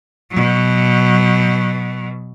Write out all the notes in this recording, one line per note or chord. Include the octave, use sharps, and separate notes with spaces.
B2 F#3